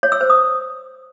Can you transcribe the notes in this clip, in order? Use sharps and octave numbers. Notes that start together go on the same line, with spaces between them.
C#5
E6
C5
D#6